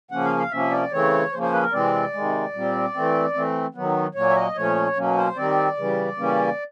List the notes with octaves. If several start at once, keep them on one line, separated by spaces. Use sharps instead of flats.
C#3 F3 A#3 C#4 F#5
F5
F5
C3 F3 A#3 C#4 E5
D5
C#3 E3 A3 C4 C#5
C#3 F3 A#3 C#4 C5
C5
B4
A#4
C3 E3 G#3 C4 D5
C3 D#3 G#3
A#2 G3 C4
E3 A3 C4
E3 A3 C4
D#3 F#3 B3
A#2 F#3 A#3 C#4 C#5
E5
D#5
A#2 F3 A3 C#4 C#5
B2 F#3 A#3 C#4
C5
D#3 G3 C4 D5
C#3 E3 G3
C#3 E3 G3 A#3 C#4